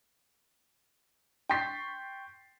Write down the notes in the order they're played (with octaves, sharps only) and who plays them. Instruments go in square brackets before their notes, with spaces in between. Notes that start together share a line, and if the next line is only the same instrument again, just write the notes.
[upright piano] G5 C6 C#6 A6 B6 C7